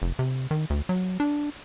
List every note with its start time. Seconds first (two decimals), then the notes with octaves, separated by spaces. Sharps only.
0.02 F1
0.19 C3
0.51 D#3
0.70 D2
0.89 F#3
1.20 D4